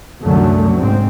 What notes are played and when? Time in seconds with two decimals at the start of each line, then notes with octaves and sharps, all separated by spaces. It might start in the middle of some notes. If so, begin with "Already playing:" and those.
0.23 C2 F#2 D3 F#3 A3
0.76 G#2 C4